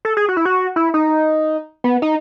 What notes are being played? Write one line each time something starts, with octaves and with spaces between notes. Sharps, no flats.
A4
G#4
F#4
E4
F#4
E4
D#4
B3
D#4